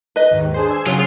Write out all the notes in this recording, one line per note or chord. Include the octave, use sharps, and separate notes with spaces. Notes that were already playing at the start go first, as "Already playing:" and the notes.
B4 D#5
D#2 G#2 D#3
D4 G#4 C5
E6 G#6
C#3 F#3 C#4 F4 G#4 D#6